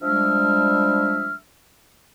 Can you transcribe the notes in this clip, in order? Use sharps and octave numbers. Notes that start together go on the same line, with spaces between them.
F3 G3 G#3 D4 E5 F6